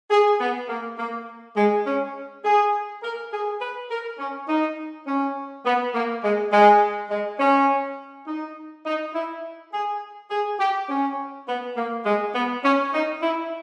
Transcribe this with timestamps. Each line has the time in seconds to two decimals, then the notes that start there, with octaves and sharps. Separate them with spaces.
0.11 G#4
0.40 B3
0.69 A#3
0.98 A#3
1.56 G#3
1.86 C#4
2.45 G#4
3.03 A#4
3.32 G#4
3.61 B4
3.90 A#4
4.19 C#4
4.48 D#4
5.07 C#4
5.65 B3
5.94 A#3
6.23 G#3
6.52 G#3
7.10 G#3
7.40 C#4
8.27 D#4
8.86 D#4
9.14 E4
9.73 G#4
10.31 G#4
10.59 G4
10.89 C#4
11.48 B3
11.77 A#3
12.05 G#3
12.34 B3
12.64 C#4
12.93 D#4
13.22 E4